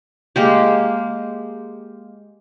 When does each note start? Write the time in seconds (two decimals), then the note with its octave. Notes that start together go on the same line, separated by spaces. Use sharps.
0.36 G#3 A#3 G4